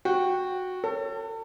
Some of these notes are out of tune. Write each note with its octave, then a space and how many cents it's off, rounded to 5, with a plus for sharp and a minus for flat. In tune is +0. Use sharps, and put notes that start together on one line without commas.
F#4 -10 G5 +0
A4 +35 C#5 +0